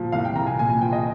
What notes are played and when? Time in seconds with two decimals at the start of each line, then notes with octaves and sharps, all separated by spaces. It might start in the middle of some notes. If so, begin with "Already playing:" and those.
Already playing: A#2 F3
0.12 C2 F5
0.25 G5
0.36 C2 A#5
0.47 G#5
0.59 A#2 G#5
0.70 G#5
0.81 F3 G5
0.93 D#5